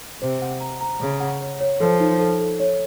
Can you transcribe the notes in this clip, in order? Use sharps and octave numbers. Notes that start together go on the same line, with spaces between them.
C3 C5
F#5
A#5
A#5
C#3 A#5
F#5
C#5
C#5
F3 A4
D#4
A4
A4
C#5